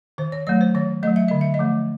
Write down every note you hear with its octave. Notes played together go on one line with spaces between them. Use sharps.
D#3 C5
C#5
F#3 A3 C#5
C5
D#3 C#5
F#3 A3 D#5
E5
D3 D#5
E5
D#5
F3 A3